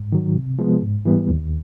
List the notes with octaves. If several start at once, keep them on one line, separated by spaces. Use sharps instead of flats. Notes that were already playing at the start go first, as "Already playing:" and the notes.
Already playing: G#2
D#3 F#3
C3
F3 G#3 B3
G#2
E3 G3 B3
D#2